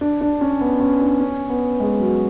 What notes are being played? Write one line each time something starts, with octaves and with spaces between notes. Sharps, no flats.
D4
D4
C#4
B3
C#4
D4
C#4
B3
G#3
F#3